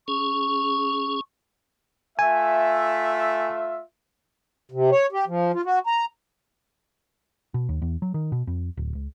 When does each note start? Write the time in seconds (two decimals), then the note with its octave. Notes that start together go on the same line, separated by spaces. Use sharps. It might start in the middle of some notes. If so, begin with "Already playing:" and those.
0.08 C#4 G#4 C#6
2.19 A3 F4 E5 G#5
4.72 C3
4.92 C#5
5.12 G4
5.28 F3
5.54 F4
5.65 F#4
5.87 A#5
7.54 B2
7.69 D#2
7.82 E2
8.02 F#3
8.14 D#3
8.32 B2
8.47 F2
8.77 D1
8.95 C#2